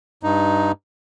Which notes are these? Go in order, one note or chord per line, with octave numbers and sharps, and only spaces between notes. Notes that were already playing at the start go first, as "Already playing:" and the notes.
G2 D#4